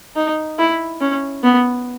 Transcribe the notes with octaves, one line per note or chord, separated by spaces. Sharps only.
D#4
E4
C#4
B3